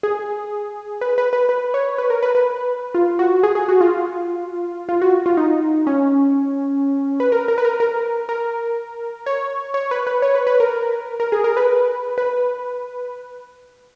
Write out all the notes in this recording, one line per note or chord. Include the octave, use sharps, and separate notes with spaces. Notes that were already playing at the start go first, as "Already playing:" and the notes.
G#4
B4
B4
B4
B4
C#5
B4
A#4
B4
B4
F4
F#4
G#4
G#4
F#4
F4
F4
F#4
F4
D#4
C#4
B4
A#4
A#4
B4
A#4
A#4
A#4
C#5
C#5
B4
B4
C#5
B4
B4
A#4
A#4
G#4
A#4
B4
B4